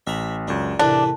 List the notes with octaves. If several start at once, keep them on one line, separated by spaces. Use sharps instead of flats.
A1 E5 A#5 B5
C#2 F#2 D4
E2 A2 C3 D4 A#4 A5 F#6